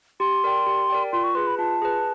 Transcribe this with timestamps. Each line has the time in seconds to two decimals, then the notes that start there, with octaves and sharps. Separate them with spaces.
0.20 G4 C6
0.44 A#4 D5 G5
0.67 G4
0.89 A#4 D5 G5
1.12 F4 C6
1.24 C#6
1.35 G#4 B4 C6
1.47 B5
1.58 F4 A5
1.82 G#4 B4